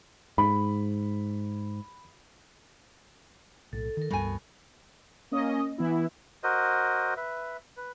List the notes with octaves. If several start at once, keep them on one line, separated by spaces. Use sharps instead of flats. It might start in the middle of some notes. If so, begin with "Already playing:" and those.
G#2 B5
B1 A2 A4
D#3 A4 A#4
C#2 G2 B2 G3 G#5
A#3 C#4 D#5
E3 B3 E4
F#4 A#4 C5 D#5
B4 E5
B4